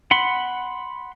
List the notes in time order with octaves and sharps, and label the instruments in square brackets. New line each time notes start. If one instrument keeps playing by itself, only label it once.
[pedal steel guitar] F#5 B5 C6